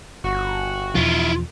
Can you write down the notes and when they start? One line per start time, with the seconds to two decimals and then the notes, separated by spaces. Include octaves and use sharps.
0.24 G1 F#4
0.95 E2 B2 F3 E4 F4